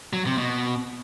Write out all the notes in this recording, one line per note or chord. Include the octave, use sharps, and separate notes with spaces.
F#3
C3
B2